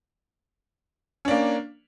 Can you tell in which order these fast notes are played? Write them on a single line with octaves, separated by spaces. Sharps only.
C#4 D4 A#3